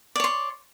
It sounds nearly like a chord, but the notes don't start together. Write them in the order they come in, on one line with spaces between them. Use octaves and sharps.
D5 C#5 C6